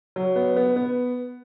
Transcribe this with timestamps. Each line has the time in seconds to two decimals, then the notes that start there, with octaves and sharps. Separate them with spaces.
0.16 F#3
0.36 B3
0.56 B3
0.76 B3